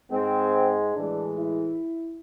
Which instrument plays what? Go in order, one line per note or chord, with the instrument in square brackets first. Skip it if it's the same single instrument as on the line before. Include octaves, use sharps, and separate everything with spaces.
[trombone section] G#2 G#3 C4
A2 E3 G#3 D4
E4